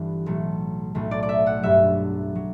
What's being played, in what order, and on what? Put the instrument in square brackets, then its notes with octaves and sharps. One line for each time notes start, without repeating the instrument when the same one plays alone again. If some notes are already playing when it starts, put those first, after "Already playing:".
Already playing: [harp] G1 G2 E3 G3 B3
B1 A2 F#3 A3
B1 A2 F#3 A3
D5
D5
E5
F#5
G1 G2 F#3 E5
F#3